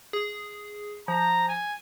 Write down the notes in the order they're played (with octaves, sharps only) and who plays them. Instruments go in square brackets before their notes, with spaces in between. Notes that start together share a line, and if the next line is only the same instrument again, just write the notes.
[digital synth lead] G#4
[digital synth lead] F3 [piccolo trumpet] A#5
[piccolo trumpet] G#5